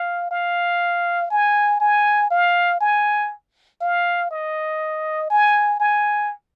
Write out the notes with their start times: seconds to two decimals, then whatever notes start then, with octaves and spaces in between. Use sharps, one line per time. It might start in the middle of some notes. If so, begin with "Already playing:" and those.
Already playing: F5
0.31 F5
1.30 G#5
1.80 G#5
2.30 F5
2.80 G#5
3.81 F5
4.31 D#5
5.30 G#5
5.80 G#5